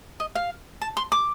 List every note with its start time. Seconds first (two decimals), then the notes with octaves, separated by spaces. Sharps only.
0.20 D#5
0.35 F5
0.82 A5
0.97 C6
1.12 D6